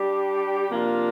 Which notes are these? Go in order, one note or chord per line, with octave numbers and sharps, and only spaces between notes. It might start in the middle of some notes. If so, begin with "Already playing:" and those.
Already playing: G3 D4 G4
C3 F3 A#3 D4 F4